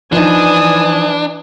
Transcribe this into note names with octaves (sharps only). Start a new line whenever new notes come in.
E3 F3 D4 D#4 G#5 D#6